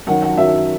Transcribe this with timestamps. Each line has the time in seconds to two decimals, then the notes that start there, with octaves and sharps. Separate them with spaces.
0.07 F#2 D#3 F#3 F#5
0.22 F#5
0.37 F#2 D#3 F#3 E5